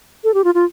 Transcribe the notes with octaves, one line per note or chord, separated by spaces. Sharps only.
A4
G4
F4
F4